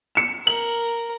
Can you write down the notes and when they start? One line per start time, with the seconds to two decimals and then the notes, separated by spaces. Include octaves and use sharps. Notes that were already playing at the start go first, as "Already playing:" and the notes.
0.15 C#7 E7
0.47 A#4 F#7